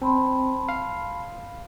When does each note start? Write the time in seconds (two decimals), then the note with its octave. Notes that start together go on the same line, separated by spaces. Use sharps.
0.02 C4 A5 B5 C6
0.69 F5